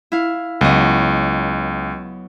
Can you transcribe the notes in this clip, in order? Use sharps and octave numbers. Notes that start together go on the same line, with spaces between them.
E4 F5
C#2 F#3 B3 D#5